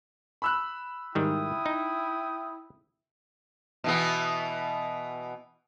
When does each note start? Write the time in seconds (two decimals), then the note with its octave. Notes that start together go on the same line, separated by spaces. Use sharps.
0.42 B5 E6 F#6
1.15 G#2 D#3 G3 E4 G5 D#6
1.66 D#4
3.84 B2 E3 B3